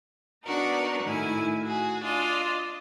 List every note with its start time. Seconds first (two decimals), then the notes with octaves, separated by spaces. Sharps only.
0.44 B3 D4 D#4 F#4 A#4
1.03 A2 D#3 E4 G#5
1.63 F#4 G#4
2.04 D4 F4 D#5